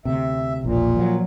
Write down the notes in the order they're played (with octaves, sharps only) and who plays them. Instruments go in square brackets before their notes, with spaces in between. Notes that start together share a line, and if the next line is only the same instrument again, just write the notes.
[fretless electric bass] D2 C3 [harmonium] E5
[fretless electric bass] E1 A#1 [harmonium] A#2
[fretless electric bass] F3 F#3